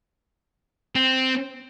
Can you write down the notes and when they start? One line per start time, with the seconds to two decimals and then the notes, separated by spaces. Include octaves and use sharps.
0.95 C4